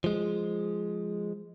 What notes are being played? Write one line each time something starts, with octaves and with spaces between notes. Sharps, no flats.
F3 G#3